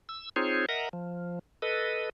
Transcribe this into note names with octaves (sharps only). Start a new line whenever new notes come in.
E6
C4 D#4 F4 G#4 C5 C#5
A#4 D#5 E5 F#5 A#5
F3
A4 B4 D#5